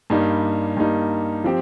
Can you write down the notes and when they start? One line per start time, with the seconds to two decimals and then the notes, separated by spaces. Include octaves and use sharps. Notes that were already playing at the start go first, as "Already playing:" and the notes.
0.10 G2 G3 A#3 D#4
0.77 G2 G3 A#3 D#4
1.44 F3 C4 G4